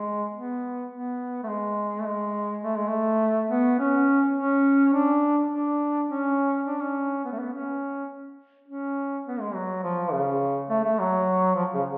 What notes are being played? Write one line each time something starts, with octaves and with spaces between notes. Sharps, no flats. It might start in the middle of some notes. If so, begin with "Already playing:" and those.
Already playing: G#3
B3
B3
A3
G#3
A3
G#3
A3
G#3
A3
B3
C#4
C#4
D4
D4
C#4
D4
C#4
B3
A3
B3
C#4
C#4
B3
G#3
F#3
F3
C#3
A3
A3
F#3
F3
C#3